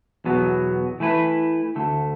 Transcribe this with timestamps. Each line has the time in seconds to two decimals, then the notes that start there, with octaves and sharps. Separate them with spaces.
0.24 E2 B2 F#3 B3
1.00 E3 A3 E4 B4
1.75 D2 D3 A3